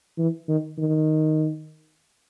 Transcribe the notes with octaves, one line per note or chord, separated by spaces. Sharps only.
E3
D#3
D#3